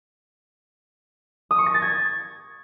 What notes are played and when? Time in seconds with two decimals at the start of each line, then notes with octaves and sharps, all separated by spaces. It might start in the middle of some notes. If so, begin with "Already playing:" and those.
1.51 D#6
1.59 C#6
1.66 A#6
1.74 A6
1.82 G#6